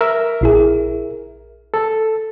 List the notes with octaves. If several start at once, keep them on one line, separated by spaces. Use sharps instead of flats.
A#4 E5
A#1 E4 G#4
A4